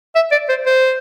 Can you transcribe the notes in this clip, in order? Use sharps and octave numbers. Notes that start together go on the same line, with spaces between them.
E5
D5
C5
C5